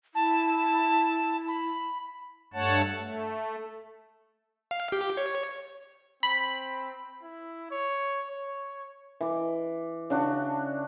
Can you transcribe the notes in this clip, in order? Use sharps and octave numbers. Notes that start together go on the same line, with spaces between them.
E4 A5
B5
G2 A3 C#5 F#5 A5
A3
F5
G4
C#5
C4 B5
E4
C#5
C#5
E3 D6
C#3 D4 F#4